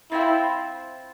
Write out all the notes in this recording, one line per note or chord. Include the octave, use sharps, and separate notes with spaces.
C4 E4 F4 C5 G5